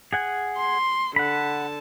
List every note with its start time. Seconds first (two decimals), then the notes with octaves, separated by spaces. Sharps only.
0.13 G#4 F#5 G#5
0.58 C6
1.16 D3 F#5 A5 B5